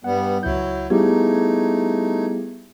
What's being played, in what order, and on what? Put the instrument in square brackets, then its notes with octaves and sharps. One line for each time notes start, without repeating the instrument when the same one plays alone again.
[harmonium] G2 G3 B3 [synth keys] F#5
[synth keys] C#2 G6 [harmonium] F#3 E4
[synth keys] G3 G4 G#6 [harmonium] A3 D#4 [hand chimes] B3 E4 G#4